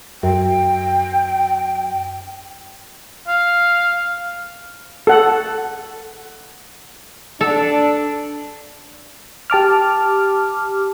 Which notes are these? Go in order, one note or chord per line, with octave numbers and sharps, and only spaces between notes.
F#2 G5
F5
A4 F#5
D4 A4
G4 A5 D6 F6